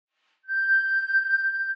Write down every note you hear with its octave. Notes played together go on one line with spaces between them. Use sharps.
G6